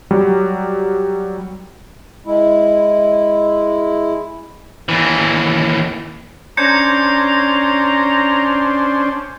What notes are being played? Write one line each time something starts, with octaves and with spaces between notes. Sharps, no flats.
F#3 G3
G#3 E4
D#2 E3
C#4 D4 C5 A#5 G6 G#6 C#7